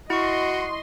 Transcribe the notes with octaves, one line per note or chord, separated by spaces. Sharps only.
E4 F#4 D#5 C6 C#6